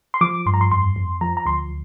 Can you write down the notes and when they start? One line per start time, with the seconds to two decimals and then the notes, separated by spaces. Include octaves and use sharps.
0.14 C6
0.21 F3 D6
0.46 G2 C6
0.54 A#5
0.61 C6
0.72 F2 C6
0.96 F2
1.21 F3 A#5
1.37 A#5
1.46 D2 C6